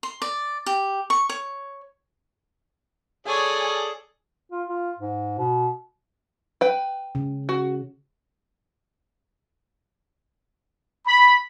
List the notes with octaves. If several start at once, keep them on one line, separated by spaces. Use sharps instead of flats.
C6
D5
G4
C#6
C#5
G#4 A4 C#5 D5 G#5
F4
F4
G#2
B2
B4 G5
C#3
F#4
B5